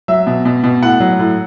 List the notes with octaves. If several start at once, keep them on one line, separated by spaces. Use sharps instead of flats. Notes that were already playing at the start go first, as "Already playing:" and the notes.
F#3 E5
B2
B2
B2
A2 F#5
F#3
A2